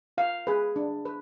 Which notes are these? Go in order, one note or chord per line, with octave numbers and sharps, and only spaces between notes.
F4 F5
G#4 B4
D4
B4